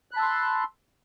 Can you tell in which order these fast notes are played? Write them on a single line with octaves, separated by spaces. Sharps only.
F#6 B5 A5 E6 C6